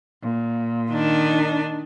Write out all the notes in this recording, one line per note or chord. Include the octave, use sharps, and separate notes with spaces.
A#2
D#3 D4